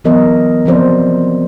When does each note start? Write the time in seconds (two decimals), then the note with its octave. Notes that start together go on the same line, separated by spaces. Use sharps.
0.04 E3 F#3 B3 A#4 D#5
0.65 F3 B3 C4 F#4 C5 D5